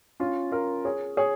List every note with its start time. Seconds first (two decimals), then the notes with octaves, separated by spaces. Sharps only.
0.20 C#4 F4
0.52 F4 A#4
0.85 G#4 C#5
1.17 G#4 C#5